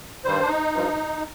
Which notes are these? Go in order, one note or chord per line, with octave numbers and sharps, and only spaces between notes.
G2 D#3 G3 C5
D4
D#4
G2 F3